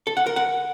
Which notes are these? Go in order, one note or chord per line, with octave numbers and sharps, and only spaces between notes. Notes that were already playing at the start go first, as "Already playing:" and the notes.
A4
F#5
A#4
F#5